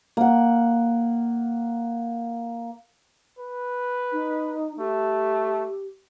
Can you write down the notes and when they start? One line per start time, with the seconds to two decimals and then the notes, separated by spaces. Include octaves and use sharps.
0.17 A#3 F#5
3.39 B4
4.12 D#4
4.79 A3 G4